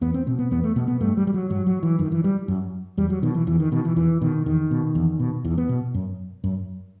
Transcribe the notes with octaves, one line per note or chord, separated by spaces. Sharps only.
E2 B3
C4
B2 C4
B3
E2 B3
A3
B2 B3
B3
G2 A3
G3
G3
F#3
G2 F#3
F#3
E3
F#2 D#3
E3
G3
F#2
E2 G3
F#3
B2 D#3
E3
E2 E3
D#3
B2 D#3
E3
E2 E3
B2 D#3
E2 D#3
B2
E2
B2
E2 E3
B3
B2
F#2
F#2